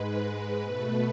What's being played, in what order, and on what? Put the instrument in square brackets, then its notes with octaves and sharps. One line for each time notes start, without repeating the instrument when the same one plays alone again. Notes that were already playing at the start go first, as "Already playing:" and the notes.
Already playing: [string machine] G#2 G#3 B4
B2 A3